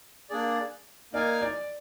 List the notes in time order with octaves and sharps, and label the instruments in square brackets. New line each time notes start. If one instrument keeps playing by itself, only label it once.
[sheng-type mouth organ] A#3 D4 G#4 D5
[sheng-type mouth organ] A#3 D#4 A#4 F5 G#5 [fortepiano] D5
[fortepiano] D5